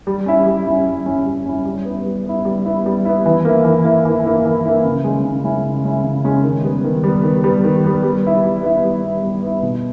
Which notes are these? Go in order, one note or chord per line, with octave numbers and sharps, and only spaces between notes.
G3
C#4 E4
G3
C#4 E4
G3
C#4 E4
G3
C#4 E4
G3
B3 E4
G3
B3 E4
G3
B3 E4
G3
B3 E4
E3
A#3 E4
E3
A#3 E4
E3
A#3 E4
E3
A#3 E4
C#3
G#3 C#4 E4
C#3
G#3 C#4 E4
C#3
G#3 C#4 E4
C#3
G#3 C#4 E4
D#3
G3 B3
D#3
G3 B3
D#3
G3 B3
D#3
G3 B3
G3
B3 E4
G3
B3 E4
G3
B3 E4
G3
B3 E4
B2